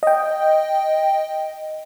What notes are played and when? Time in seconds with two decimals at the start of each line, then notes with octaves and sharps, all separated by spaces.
0.03 D#5 G5